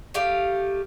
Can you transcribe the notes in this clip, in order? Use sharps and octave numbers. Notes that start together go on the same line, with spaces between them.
A3 G4 F5